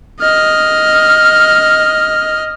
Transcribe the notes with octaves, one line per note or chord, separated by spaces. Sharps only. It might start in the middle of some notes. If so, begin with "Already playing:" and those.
D#5 F6